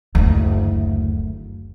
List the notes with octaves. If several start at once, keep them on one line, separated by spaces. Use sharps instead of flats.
F#1 D2